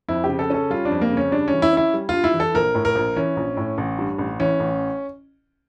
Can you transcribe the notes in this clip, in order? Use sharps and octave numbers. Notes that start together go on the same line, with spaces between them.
F2 E4
C#3 G4
A4
C#4 A4
G3 F4
D4
F2
A#3
C#3
C#4
G2 D4
E3 C#4
E4
C#4 E4
G3
G2 F4
E4
E3
A4
A#1 A#4
A2
A#4
A#1
E3 C#4
A#1
A2
A1
G2
A1
E3 C#4
A1